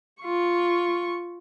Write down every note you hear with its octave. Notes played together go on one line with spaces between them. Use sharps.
F4 C#6